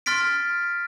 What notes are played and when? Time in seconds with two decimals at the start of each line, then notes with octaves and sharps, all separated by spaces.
0.06 C6 F6 A6 B6 D7